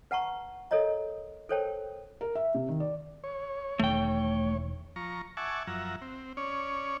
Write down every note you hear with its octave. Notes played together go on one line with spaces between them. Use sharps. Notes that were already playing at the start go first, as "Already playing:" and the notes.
B4 F#5 A5 A#5 C#6
A4 A#4 C#5 D#5 A#5
A4 A#4 C5 C#5 G5 A5
A#4
E5
C3
D#3
D5
C#5
E1 D#3 A3 G5
F3 A#5 C#6
E5 F#5 G#5 A5 C#6 D6
F#2 F3 E5 F#5 A#5
C4
C#4 C#5 D5